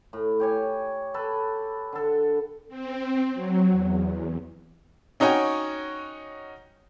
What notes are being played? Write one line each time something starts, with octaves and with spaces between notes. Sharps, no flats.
A2
G4 C#5 G#5
A4 B4
D3 A4
C4
F#3
E2
C#4 D#4 F#4 C#5 G5 G#5